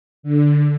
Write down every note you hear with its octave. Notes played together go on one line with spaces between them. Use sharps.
D3